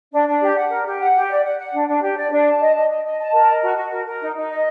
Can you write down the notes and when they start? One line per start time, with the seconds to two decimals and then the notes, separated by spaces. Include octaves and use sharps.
0.12 D4
0.27 D4
0.42 G4
0.57 F#5
0.70 A#4
0.86 G4
0.99 F#5
1.15 G4
1.29 D5
1.43 F#5
1.58 F#5
1.72 D4
1.87 D4
2.01 G4
2.16 D5
2.31 D4
2.46 A5
2.61 D#5
2.75 D#5
2.89 D#5
3.04 D#5
3.18 A5
3.34 A#4
3.48 D#5
3.62 F#4
3.76 F#4
3.91 A#4
4.06 A#4
4.21 D#4
4.35 D#4
4.50 D#5